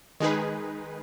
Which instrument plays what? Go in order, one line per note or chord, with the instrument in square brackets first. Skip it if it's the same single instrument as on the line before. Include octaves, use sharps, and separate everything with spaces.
[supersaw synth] D#3 G#3 D#4 G#4 B4